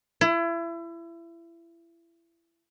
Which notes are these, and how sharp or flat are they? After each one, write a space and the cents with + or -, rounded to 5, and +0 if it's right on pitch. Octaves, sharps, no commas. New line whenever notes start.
E4 +30